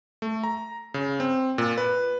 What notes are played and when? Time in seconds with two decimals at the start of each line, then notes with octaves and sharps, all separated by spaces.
0.22 A3
0.44 A#5
0.94 C#3
1.20 C4
1.58 A#2
1.78 B4